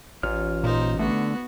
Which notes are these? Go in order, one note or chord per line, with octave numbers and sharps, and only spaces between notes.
A1 F4 C#5 F6
A#2 D#4 C5
D3 A3 B3 F#4